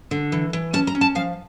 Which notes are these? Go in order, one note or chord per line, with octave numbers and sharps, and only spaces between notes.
D3
E3
E3
C#4 A5
A#5
C#4
A5
F3 F5